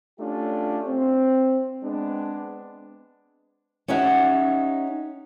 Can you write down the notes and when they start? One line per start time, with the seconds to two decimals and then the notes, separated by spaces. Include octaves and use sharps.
0.20 A3 C#4 D4 F4 G4
0.87 C4
1.83 G#3 B3 C4 D4
3.88 C#4 D#4 G4 E5 F#5